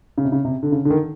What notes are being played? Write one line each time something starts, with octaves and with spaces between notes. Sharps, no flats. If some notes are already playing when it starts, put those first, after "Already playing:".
C#3
C3
C#3
C3
D3
C#3
D3
D#3